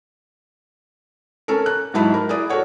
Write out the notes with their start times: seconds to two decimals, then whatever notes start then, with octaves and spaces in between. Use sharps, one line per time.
1.48 C#4 A4 A#4
1.66 F#6
1.94 G#2 F#3 D#4 E4 A5 B5
2.14 A#4
2.29 E4 G#4 D5 D#6
2.50 F#4 A4 A#4 C#5 F#5